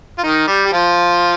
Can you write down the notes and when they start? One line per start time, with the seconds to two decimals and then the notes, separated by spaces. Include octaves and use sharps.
0.18 F4
0.23 D#3 D#4
0.48 G3 G4
0.66 G4
0.72 F3 F4